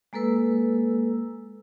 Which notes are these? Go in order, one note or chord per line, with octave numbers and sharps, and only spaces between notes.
G#3 A#3 A4 B4 E6